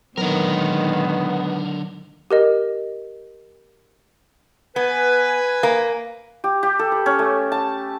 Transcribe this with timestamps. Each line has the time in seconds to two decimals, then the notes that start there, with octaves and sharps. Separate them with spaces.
0.17 A#2 D3 D#3 F#3 G#3 B3 A#4
2.31 G4 A#4 D#5
4.76 B3 B4 G#5
5.63 A#3
6.44 G4
6.63 G4
6.79 A4
6.92 B4
7.06 C#4
7.19 A3
7.52 A5